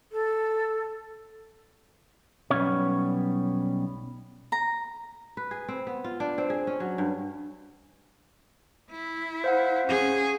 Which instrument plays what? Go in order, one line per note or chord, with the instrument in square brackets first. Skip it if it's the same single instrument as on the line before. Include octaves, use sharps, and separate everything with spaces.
[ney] A4
[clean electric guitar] B1 G#2 G3 B3 C#4 C#5
[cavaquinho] A#5
[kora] B4
G#4
C4
B3
F4
D4
C4
G#4
C#4
F#3
G2
[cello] E4
[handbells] C5 F5 F#5
[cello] C#4 G#4